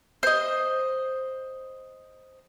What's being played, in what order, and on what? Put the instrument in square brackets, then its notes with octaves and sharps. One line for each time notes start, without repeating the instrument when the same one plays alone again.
[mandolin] C5 D#5